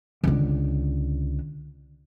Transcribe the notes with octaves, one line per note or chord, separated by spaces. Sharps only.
C#2 D3